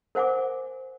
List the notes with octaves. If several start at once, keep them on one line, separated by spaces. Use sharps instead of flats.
A#4 C5 F#5 G#5 D6